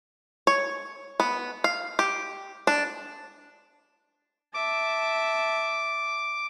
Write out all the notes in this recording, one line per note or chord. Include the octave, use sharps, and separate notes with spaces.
C#5
B3
F5
G4
D4
E5 A5 D6